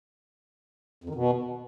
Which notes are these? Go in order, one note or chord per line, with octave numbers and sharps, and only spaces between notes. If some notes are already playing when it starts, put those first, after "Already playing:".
F2
D#3
B2